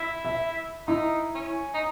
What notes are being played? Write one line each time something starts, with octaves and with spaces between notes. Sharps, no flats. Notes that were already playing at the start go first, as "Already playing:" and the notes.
Already playing: E4
E5
D#4 E4
C#4
D#4